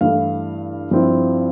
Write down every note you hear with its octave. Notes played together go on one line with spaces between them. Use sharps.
G2 E3 A3 E4 F5
G2 F3 C4 E4